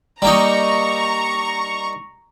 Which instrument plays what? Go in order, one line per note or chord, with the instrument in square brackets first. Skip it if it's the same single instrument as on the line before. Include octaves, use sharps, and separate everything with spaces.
[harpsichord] G3 A#3 D#4 [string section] A#5 C#6